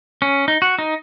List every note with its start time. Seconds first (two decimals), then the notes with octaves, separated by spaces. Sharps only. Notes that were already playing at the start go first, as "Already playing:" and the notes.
0.22 C#4
0.48 D#4
0.62 F#4
0.79 D#4